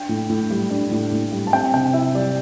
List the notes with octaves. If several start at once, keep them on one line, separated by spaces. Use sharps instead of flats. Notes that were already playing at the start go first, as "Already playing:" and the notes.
Already playing: D4 G5
A2
A2
G3
D4
A2
A2
G3
A5
C4 G5
C3 G5
E4 E5
G3 D5